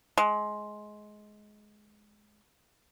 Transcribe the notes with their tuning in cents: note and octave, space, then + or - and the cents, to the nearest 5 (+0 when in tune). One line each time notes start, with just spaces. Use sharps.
G#3 +15